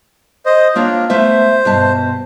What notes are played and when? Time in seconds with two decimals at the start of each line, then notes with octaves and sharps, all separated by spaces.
0.46 C5 D#5
0.76 A#3 D4 F4 C#5
1.10 A3 B3 C5 E5
1.65 G2 B2 A5